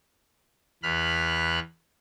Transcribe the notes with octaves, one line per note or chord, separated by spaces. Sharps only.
E2 B5 F6 F#6